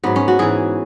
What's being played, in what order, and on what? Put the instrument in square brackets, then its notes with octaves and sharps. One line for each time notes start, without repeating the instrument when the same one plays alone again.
[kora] G#2 F#3 B3
C#4
F#4
G#2 E3 G#4